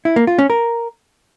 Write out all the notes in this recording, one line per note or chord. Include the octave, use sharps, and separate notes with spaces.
E4
A#3
F4
C#4
A#4